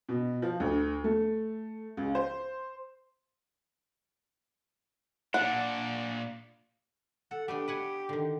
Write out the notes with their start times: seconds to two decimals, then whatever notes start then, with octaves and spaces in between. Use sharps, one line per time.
0.09 B2
0.42 F3
0.60 D2
1.04 A3
1.97 C#2
2.15 C5
5.34 A#2 D4 F#5
7.31 A4 F#5
7.48 A3 B3 D4 G4
7.68 B4 F#5 G#5
8.09 D3 D#3